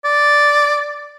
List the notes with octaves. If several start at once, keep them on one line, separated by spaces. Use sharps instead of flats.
D5